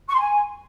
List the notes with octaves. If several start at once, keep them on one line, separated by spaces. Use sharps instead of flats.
C#6
C6
G#5